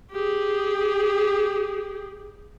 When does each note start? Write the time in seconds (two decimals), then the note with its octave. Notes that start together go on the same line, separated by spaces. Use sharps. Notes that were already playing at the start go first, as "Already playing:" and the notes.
0.12 G4 G#4